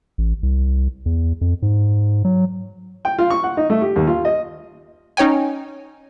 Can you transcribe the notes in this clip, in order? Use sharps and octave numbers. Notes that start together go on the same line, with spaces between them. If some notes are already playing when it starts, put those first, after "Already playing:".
A1
C2
E2
F2
G#2
F#3
G5
F4
C#6
F#5
D#4
A3
G4
D#2
F4
D#5
C#4 D#4 C#5 G5 G#5